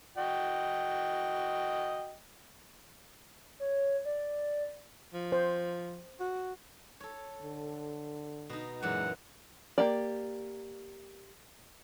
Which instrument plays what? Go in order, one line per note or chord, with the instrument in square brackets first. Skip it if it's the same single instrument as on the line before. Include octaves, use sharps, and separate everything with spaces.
[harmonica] F#4 D#5 G5
[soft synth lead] C#5
D5
[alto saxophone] F3
[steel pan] C5
[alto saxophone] F#4
[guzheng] A4 C#5
[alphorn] D3
[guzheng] B2 D#4
[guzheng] F#2 A#2 E3 [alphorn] G#3 [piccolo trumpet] F#5
[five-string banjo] A#3 G4 D5